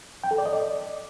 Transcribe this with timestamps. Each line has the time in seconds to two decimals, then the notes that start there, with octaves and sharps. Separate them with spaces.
0.24 G5
0.31 A4
0.38 D5
0.46 D#5
0.53 D5